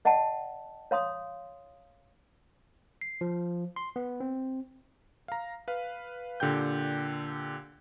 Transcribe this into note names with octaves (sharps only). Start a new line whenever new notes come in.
D5 D#5 F#5 G5 A5
C#5 F5 C6 D#6
C7
F3
C6
B3
C4
F5 A#5
B4 F5
A#2 D3 G4 G5 G6